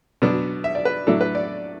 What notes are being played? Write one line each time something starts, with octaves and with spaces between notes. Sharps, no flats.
B2 F#3 B3 D4
E5
D5
B4
A2 F#3 A3 D4 A4
B4
D5